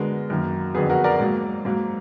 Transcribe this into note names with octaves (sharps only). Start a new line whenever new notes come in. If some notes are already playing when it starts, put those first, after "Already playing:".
Already playing: D3 G#3 B3 F#4 A#4
F#2 D#3 A#3
F2 D3 F#3 B3 G#4
F#4 A#4
A#4 D5
G#2 F#3 A#3
G#2 F#3 A#3